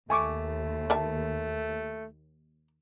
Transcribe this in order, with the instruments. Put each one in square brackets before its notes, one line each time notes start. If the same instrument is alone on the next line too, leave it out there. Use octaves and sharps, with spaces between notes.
[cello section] D#2 [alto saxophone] A3 [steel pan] G#5 C#6 D6
[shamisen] A#4 E5 A5